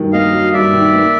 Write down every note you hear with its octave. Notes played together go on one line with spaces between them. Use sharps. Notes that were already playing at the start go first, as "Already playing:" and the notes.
Already playing: G2 D#3 F#3 A#3
A#3 D#5 F5
F#3
G2 D5 E5
D#3
A#3